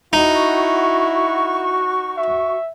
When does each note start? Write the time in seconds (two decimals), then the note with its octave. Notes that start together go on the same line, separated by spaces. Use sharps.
0.13 D#4 E4 F#4 C#6
2.17 E5